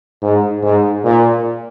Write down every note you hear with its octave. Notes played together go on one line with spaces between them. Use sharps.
G#2
G#2
A#2